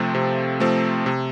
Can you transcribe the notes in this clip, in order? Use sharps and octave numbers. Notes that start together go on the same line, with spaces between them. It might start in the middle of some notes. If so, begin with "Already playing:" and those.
Already playing: C3 F3 A3 C4
C3
F3 A3 C4
C3